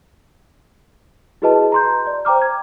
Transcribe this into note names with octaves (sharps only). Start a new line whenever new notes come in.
E4 F#4 G#4 B4 D#5 A5
A#5 C6 G6
D5
C5 G5 A#5 D6 F6
G#6